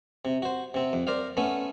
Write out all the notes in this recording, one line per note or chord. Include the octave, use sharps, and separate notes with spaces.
C3
F#4 C5
C3 C4
F2
A#4 C5 D5 F5
A3 B3 C#4